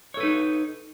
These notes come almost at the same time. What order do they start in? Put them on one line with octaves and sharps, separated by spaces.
C#5 A4 B4 D#4